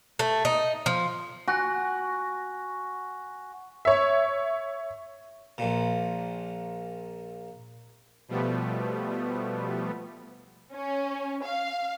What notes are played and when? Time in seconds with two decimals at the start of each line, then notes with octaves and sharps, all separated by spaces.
0.19 A3
0.45 D#4
0.86 F3
1.48 F#4 G#5 F#6 A#6
3.85 C#5 E5
5.58 A#1 A#2
8.28 B2 F3 G3 A3 B3
10.73 C#4
11.45 F5